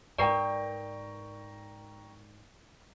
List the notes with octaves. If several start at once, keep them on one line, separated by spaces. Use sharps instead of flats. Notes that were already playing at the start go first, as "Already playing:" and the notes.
G#2 A#4 B4 D5 G5 A#5 C#6